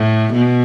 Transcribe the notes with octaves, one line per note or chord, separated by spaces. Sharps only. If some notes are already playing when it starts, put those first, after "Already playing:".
Already playing: A2
B2